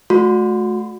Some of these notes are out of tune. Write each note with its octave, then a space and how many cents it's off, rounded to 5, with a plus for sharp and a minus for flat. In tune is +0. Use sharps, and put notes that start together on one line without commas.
A3 -30 F#4 -30 C6 -15